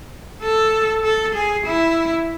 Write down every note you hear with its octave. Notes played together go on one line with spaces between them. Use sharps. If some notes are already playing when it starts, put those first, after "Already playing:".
A4
A4
G#4
E4